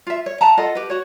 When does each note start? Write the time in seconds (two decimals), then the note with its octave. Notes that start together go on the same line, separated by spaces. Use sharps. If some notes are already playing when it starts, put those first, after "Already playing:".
0.07 F4 E5
0.26 C#5
0.41 E5 F#5 A5 A#5
0.58 F4 A4 D#5 F#5
0.75 G4 B4
0.90 F#4 C#5